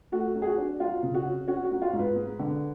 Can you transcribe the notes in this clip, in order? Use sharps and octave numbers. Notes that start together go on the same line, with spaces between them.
A3 F#4
F#3
G#4
F#4
D4
F#3 F4
C#3
F#4
C#4
C#4 F#4
F#4
F#3
F4
G#2
B4
G#3
D3